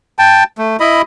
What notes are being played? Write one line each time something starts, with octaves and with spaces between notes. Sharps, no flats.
G5 A5
A3
E4 D#5 B5